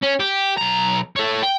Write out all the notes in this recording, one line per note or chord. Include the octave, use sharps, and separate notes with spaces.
C#4
G4
B1 A#5
A4 C#5
G5